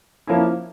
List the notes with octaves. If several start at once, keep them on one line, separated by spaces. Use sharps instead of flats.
F3 A#3 C#4 E4